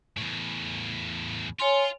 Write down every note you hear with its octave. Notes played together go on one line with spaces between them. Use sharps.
E2 A2
F4 C#5 G#5 C6